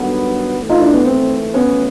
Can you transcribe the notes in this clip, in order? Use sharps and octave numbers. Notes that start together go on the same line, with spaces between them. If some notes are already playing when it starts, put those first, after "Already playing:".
Already playing: G2 D#3 F#3 B3 A4
G#1 G#2 E3 A3
D#4 F4
D4 E4
B3
C4
E2 C3 F3 A3 B3 C#4